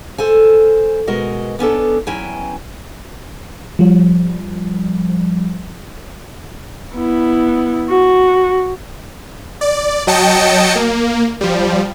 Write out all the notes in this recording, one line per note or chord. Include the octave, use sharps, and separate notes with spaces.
A4 C5 G#5
B2 G#3 F#4 A#4 D#5 F#5
B3 C#4 D4 A4
E2 F#3 C#4 E4 G5 G#5
F3 G3
B3 E4
F#4
D5
F#3 D#5 G5 A5 C#7
A#3
F3 G3